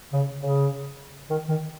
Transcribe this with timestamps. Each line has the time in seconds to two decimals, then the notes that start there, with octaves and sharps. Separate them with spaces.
0.12 C#3
0.41 C#3
1.29 D#3
1.48 D#3